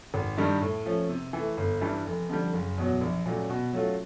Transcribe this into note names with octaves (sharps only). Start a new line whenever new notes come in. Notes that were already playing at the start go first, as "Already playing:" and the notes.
G#1
G2 D#3 G3
A2
F3 A3 C#4
C3
E3 A3
G1
G2 E3 G3
F1
F2 D3 G3
F#1
E2 B2 F#3
A#1
A#2 F#3 A3 C#4
B2
F#3 A3 C#4 F4